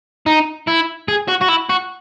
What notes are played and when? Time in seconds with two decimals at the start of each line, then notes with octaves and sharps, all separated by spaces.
0.26 D#4
0.67 E4
1.08 G#4
1.28 F#4
1.41 F#4
1.49 E4
1.70 F#4